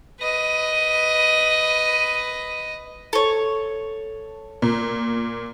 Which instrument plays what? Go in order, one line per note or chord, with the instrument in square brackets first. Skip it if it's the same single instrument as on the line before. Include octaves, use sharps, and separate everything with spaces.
[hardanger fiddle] B4 D#5
[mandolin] A4 C#5
[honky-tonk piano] A#2